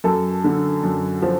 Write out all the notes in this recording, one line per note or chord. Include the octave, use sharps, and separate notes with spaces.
F#2 A4
D3
F#2
F3